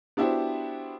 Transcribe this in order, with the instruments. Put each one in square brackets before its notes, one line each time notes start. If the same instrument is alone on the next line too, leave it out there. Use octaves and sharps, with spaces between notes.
[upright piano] B3 D4 E4 F#4 G4 C5